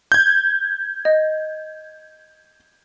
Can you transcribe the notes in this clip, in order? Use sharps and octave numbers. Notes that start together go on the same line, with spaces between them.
G6 G#6
D#5